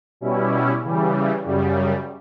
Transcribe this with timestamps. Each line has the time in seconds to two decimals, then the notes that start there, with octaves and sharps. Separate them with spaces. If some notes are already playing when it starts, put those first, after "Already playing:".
0.21 B2 G3 C#4 E4
0.82 C#3 E3 G3
1.44 F#2 C#3 G3